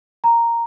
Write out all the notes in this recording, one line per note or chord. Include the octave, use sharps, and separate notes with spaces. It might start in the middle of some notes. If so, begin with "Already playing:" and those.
A#5